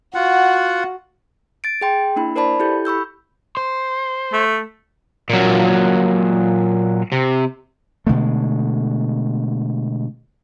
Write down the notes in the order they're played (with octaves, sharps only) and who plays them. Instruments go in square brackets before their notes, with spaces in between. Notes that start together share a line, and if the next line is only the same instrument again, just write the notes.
[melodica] F4 F#5 [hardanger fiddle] F#4
[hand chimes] A6 D7
G#4 G5 C6
A#3 D4 E4 B5
A#4 C5 D5 A5 B5
E4 G4 A4 G6
B5 C#6 E6 G6
[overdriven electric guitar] C5
[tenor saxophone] A3
[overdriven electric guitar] A#2 F#3
C3
[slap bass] B2 D3 G#3 A3